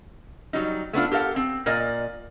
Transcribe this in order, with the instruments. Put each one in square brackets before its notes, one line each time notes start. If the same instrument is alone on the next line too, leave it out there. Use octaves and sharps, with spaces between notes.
[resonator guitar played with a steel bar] F#3 G3 D#4
A3 B3 D4 F4
G4 A4 A#4 F5 F#5
C4
A#2 A#4 D5 D#5